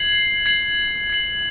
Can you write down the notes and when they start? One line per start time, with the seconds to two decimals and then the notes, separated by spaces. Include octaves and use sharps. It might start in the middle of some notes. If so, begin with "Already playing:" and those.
Already playing: G#6 C7 F#7
0.46 G#6 C7 F#7
1.10 G#6 C7 F#7